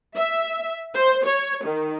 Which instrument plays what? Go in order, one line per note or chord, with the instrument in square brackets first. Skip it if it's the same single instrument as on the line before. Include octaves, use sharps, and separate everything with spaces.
[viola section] E5
C5
C#5
D#3